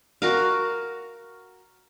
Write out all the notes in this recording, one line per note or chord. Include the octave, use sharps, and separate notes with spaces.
F#4 A#4 F5